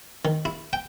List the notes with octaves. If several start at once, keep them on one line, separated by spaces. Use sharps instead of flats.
D#3
E4
G5